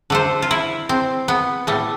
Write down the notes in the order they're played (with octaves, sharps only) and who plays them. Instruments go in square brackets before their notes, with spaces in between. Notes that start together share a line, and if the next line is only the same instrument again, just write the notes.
[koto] D3 A3 C5
F4
E4
C4
B3
A2 G3 A3